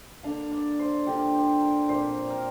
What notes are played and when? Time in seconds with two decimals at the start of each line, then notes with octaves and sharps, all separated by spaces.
0.23 D3 A#3 D4 F5
0.51 D5
0.79 C5
1.06 D3 A#3 F4 G4
1.34 C5
1.61 A#4
1.89 A#2 F3 C4 F4 C5
2.30 A#4